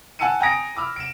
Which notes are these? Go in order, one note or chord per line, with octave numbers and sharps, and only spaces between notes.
F#5 G#5 A5 E6 C#7 D#7
G5 G#5 A#5 D#6 A#6 D7
B5 D6 E6 F6
D7 E7